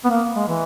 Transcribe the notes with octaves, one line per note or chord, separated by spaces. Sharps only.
B3
A#3
G#3
E3